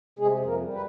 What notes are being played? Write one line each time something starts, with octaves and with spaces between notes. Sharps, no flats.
C3 G#3 G#4
F2
A#3 A#4
G3
B4